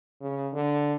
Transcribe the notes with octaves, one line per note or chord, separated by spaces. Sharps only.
C#3
D3